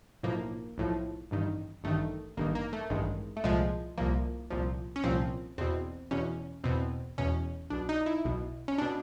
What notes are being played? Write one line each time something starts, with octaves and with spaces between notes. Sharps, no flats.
B1 A2 F3 A#3
B1 A2 F3
A1 G2 D#3
A1 G2 D#3 A3
A1 G2 D#3 A#3
A#3
A3
A1 G2 D#3 G#3
A3
C2 A#2 F3 G#3
C2 A#2 F3 A#3
C2 A#2 F3
C#4
C2 A#2 F3 C4
E2 B2 C4
E2 B2 C#4
E2 B2 C4
E2 B2 C#4
B1 B2 D4
D#4
E4
B1 B2
C#4
B2 D4